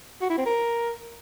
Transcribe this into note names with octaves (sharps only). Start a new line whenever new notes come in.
F#4
E4
C4
A#4